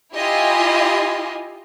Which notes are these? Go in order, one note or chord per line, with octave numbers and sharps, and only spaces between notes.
E4 F4 G4 D#5 G#5